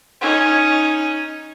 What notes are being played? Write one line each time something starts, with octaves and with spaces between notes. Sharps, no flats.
C#4 D#4